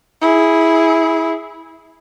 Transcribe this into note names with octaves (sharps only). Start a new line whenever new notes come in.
E4 G#4